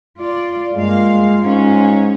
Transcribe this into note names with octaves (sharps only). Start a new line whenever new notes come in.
F4 D5
G2 G#3 A#3 F4 F5
G#2 C#4